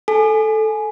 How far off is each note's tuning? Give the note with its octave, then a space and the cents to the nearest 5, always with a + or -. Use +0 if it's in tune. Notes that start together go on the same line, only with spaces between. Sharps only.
A4 -5 G#5 +15